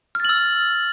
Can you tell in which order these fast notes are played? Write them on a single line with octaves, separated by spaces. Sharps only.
F6 A6 F#7 E6